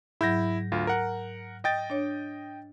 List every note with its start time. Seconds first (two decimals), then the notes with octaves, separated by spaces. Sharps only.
0.21 G#2 F#3 E4 G6 A#6
0.72 D2 F4
0.87 A#4 F#5
1.64 D#5 G5 A6
1.90 D4 C#5